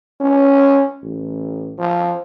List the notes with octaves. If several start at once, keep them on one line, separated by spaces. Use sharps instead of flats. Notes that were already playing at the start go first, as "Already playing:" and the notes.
C#4
A1
F3